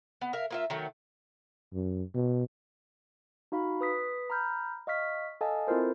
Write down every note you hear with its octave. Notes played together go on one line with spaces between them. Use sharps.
B3
A#4 E5 F5
A#3 F4 E5
D#3 F#3 A3
F#2
B2
D#4 F#4 F5 B5
B4 D#6 B6
A#5 B5 F6 G6
D#5 F5 C#6 F6 B6
A4 D#5 F5 G#5 A5
C4 E4 F4 A4 A#4 C5